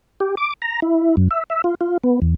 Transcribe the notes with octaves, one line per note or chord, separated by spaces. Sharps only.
G4
D6
A#5
E4
F#2
E5
E5
F4
F4
B3
E2